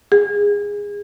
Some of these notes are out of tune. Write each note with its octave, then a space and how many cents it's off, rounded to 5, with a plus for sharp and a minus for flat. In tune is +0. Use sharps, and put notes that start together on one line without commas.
G#4 -20